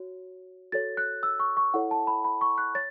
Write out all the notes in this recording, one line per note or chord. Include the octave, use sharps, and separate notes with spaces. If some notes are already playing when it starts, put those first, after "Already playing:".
Already playing: F#4 C#5
F#4 A4 C#5 A6
F#6
E6
C#6
C#6
E4 A4 C#5 F#5
A5
B5
B5
C#6
F#6
C#5 A6